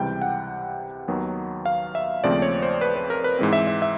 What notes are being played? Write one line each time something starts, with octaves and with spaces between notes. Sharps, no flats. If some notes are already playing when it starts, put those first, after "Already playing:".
Already playing: C#2 C3 E3 G3 G5
F#5
D#2 D#3 F#3 B3
F5
E5
D#2 C#3 F3 A3 C4 D5
C#5
C5
B4
B4
A#4
B4
G#2 E3 G#3 C4
E5
E5
E5